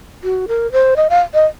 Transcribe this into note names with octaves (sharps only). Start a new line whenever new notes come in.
F#4
A#4
C5
D#5
F5
D#5